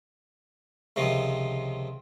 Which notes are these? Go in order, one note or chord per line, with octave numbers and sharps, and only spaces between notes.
C#2 C3 D#3 F3